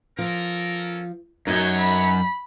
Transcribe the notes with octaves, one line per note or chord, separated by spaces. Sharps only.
F3 C#4 A4 A#4
F#2 B3 C4 D#4 F#4 C#5 G6 G#6
B5